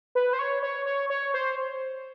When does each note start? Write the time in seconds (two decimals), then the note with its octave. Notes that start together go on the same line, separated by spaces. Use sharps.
0.15 B4
0.33 C5
0.39 C#5
0.63 C#5
0.86 C#5
1.10 C#5
1.34 C5